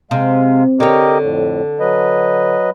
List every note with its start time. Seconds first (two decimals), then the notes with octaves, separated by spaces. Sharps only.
0.11 C3 G#3 F5
0.80 D3 G4 A#4 C#5 D#5
1.22 F2 A2
1.80 F#3 B4 D#5